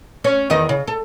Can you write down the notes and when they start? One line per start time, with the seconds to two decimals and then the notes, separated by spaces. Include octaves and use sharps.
0.24 C#4
0.50 E2 D#3 D#5
0.69 C#3
0.88 A4